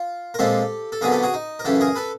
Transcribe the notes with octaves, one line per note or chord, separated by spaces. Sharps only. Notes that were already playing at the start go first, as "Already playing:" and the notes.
Already playing: F4
A#4
A#2 F3 G#3 C4 G4 A4
A4
F2 D3 F#3 B3 G#4 A#4
G4 A4
F#4 G#4
D#4
A#4
F#2 C#3 E3 G4 A4
G#4 A#4
A4 B4